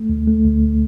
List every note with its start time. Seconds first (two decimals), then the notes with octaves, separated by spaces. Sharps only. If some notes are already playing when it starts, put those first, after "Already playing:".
Already playing: A3
0.09 D2
0.28 A3
0.45 D2